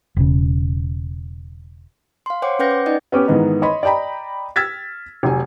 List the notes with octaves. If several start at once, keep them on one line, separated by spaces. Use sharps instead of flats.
E1 C#3
F5 C6
C5 C#5 F#5 G5 C6 D6
C#4 B4 F#5 G5 G6 A#6
D6
D#4 D5 D#5 G5
B3 C#4 G4
G#2 D#3 E3 B3 D#4
C#5 D#5 B5 C6
D5 D#5 G5 A#5 B5
E6 F6 G#6 A6 B6
F1 F#3 G#5